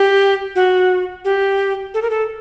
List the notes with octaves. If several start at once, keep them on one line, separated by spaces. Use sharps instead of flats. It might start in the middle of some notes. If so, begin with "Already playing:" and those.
Already playing: G4
F#4
G4
A4
A#4
A4